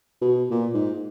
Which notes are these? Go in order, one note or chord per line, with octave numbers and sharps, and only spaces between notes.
B2
A#2
G#2